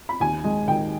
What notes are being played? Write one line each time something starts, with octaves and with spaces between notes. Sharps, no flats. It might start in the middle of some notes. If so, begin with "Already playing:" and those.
B5
D#2 G#5
G#3
D#3 G5